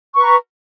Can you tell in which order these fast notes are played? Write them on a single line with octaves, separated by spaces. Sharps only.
C#6 B4 A#5